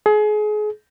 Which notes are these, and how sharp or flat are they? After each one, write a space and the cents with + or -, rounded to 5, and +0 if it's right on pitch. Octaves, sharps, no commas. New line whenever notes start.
G#4 +30